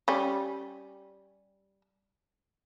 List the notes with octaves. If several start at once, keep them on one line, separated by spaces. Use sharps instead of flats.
G3 C#4